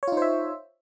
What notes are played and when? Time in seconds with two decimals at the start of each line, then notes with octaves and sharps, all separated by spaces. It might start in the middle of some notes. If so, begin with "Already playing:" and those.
0.03 C#5
0.07 F4
0.12 D#4
0.17 C5
0.22 E5